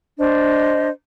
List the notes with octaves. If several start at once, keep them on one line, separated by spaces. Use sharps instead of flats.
D4 C5 D#5